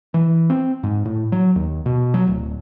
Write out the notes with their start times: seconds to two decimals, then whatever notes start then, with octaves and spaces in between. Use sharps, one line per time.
0.14 E3
0.50 C4
0.83 G#2
1.05 A2
1.32 F#3
1.56 D#2
1.86 B2
2.14 F#3
2.27 D1